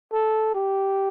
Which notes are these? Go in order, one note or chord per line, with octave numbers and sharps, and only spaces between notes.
A4
G4